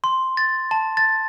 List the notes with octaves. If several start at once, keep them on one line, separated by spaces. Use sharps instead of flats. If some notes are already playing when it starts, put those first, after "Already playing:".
C6
A6
A5
A6